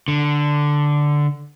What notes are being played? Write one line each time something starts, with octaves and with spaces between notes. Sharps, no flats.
D3